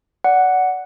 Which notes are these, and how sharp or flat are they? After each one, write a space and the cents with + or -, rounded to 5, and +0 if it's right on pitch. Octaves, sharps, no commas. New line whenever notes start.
D5 -20 F#5 +0